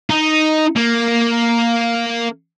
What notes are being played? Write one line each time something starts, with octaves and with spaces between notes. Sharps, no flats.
D#4
A#3